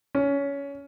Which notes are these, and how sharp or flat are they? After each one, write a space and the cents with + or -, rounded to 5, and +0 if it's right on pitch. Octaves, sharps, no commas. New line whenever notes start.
C#4 +20